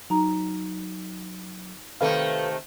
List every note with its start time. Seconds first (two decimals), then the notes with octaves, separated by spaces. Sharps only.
0.10 F#3 D#4 A#5
2.01 C3 D#3 A3 A4 B4 F5